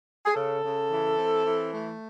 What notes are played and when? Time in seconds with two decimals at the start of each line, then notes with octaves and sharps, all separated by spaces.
0.25 G#4
0.35 C#3 A4
0.63 C#3
0.90 E3
1.18 C4
1.44 E3
1.72 A3